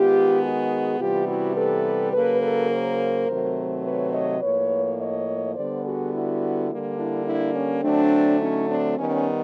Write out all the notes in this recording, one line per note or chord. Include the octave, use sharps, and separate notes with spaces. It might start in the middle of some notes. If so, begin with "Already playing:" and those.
Already playing: D#3 G#3 B3 F4 G4
F#4 G#4
C3 E3 G3 B3 F4 G4
E4 F#4
A4 B4
C#3 F#3 A#3 A4 B4
A4 B4
A#4 C5
C3 D#3 F#3 A3 C4
B4 C#5
C#5 D#5
A2 F3 A#3 B4 C#5
C#5 D#5
D3 G3 B3 C5 D5
F#4 G#4
E4 F#4
D3 G3 A#3
D4 E4
D4 E4
C#4
D3 F#3 A3 C4 D4
C#4 D#4
C4 D4
D#3 G3 B3 C#4